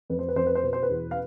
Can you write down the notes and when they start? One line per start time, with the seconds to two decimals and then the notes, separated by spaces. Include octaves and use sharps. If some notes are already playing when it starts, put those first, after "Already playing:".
0.10 F2 B4
0.19 C5
0.28 B4
0.36 F2 C5
0.46 B4
0.55 C5
0.64 B2 B4
0.73 C5
0.83 B4
0.90 E2
1.11 F5